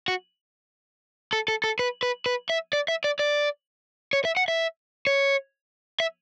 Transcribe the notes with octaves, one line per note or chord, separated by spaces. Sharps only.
F#4
A4
A4
A4
B4
B4
B4
E5
D5
E5
D5
D5
C#5
E5
F#5
E5
C#5
E5